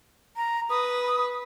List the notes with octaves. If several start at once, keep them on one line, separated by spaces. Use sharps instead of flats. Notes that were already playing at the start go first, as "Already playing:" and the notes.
A#5
B4 D#6